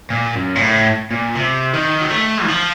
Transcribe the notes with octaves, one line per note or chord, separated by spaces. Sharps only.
A#2
F#2
A#2
A2
A#2
C3
D#3
F#3
A3
D#3
F3